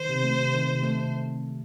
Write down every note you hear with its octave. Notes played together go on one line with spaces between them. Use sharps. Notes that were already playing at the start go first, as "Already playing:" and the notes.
Already playing: D#3 C5
C3
A3
C3
D#3
C3
A3
C3